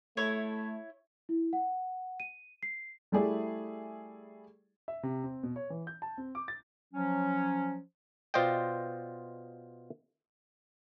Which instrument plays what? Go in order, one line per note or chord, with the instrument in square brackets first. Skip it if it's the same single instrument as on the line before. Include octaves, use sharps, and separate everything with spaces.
[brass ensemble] A3 [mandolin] E4 C#5
[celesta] E4
F#5
D#7
C7
[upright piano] G3 A3 E4 G#4 D5
[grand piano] E5
C3
C4
B2
C#5
E3
G6
A5
C4
D6
A6
[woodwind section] F3 F#3 C#4
[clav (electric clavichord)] B2 F4 C5 D5 D#5 G5